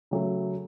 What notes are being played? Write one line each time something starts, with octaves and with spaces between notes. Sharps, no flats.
C#3 F#3 A3